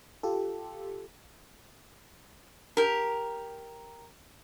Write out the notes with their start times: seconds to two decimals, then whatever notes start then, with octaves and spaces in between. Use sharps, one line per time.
0.23 F4 G4 A4
2.77 G4 A#4